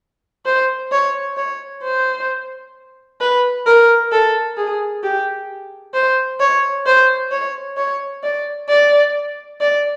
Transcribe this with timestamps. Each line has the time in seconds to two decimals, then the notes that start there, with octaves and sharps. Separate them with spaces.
0.46 C5
0.92 C#5
1.37 C#5
1.83 C5
3.21 B4
3.66 A#4
4.12 A4
4.57 G#4
5.03 G4
5.94 C5
6.40 C#5
6.86 C5
7.32 C#5
7.77 C#5
8.23 D5
8.69 D5
9.61 D5